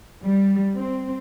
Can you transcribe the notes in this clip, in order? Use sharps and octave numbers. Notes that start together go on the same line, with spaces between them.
G3
C4